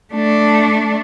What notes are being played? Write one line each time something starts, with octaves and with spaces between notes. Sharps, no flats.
A3 D4